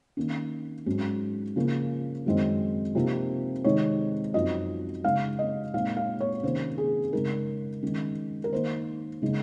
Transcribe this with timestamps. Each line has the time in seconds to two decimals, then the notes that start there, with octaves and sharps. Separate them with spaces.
0.17 D#3 A#3 C#4
0.86 G#2 F#3 C#4
1.56 C#3 F3 A#3 C#4
2.26 F#2 D#3 G#3 C4 D#4
2.95 C3 F3 A#3 D#4
3.64 C3 D#3 G#3 D#4 C#5
4.34 F#2 F3 C4 D#4 D#5
5.04 C#3 G#3 D#4 F5
5.39 D#5
5.74 A#2 G#3 C4 D#4 F5
5.97 F5
6.20 C#5
6.43 C3 D#3 A#3 C#4 C5
6.78 G#4
7.13 C#3 G#3 D#4 A#4
7.82 D#3 G#3 C#4
8.44 A#4
8.52 D#3 A#3 D#4 C5
9.22 C#3 G#3 D#4